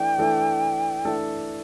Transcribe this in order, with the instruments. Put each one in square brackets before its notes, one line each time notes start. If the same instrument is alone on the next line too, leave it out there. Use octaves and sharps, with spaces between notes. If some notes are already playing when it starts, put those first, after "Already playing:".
Already playing: [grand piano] E3 A3 D4 [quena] G5
[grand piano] E3 A3 D4 A4
E3 A3 D4 A4